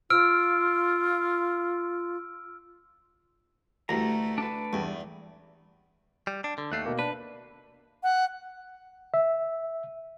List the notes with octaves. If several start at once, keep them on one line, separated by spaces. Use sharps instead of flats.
F4 E6 F6 D7
D2 E3 G3 A3 A#5
D4 B4
E2 G2 A3
G3
D4
D3
D#2 A3 F#6 C7
B2 A#3
D4 B4
F#5
E5